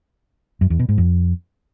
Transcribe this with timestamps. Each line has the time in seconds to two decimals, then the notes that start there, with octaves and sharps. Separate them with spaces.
0.61 F#2
0.70 E2
0.79 B2
0.89 G#2
0.98 F2